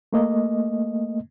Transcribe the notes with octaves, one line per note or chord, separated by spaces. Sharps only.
A3 A#3 D#5